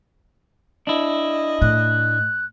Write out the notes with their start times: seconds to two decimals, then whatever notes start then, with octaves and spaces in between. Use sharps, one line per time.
0.87 D4 E4 D#5
1.62 A2 F#6